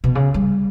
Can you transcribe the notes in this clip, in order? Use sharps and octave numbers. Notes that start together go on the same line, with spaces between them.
B2
C#3
G3